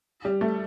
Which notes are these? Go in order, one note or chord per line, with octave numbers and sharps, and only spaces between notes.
G3
A3